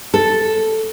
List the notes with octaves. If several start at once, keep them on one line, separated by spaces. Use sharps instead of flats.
A4